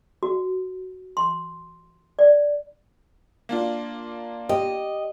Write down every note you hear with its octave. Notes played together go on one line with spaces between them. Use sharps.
F#4
C6
D5
A#3 D4 F4
G4 D#5